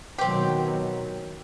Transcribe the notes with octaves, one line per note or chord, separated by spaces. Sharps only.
B2 D#3 F#3 C4 G4